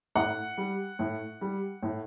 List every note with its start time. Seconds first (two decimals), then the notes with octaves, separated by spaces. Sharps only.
0.15 A2 F#5
0.57 G3
0.99 A2
1.41 G3
1.83 A2